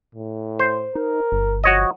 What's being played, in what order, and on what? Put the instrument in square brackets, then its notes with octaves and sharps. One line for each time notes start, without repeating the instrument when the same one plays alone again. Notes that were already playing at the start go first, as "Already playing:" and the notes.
[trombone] A2
[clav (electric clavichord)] C5
[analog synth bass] D#4 [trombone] A#4
[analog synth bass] G1
[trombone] F3 [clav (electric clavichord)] F#4 C#5 D#5